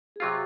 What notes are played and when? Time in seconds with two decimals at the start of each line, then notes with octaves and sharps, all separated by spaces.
0.16 G#4
0.20 C3 F#3 C4 F4 F#4